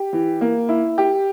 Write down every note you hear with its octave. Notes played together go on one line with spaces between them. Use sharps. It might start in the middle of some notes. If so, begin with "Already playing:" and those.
Already playing: G4
E3
A#3
E4
G4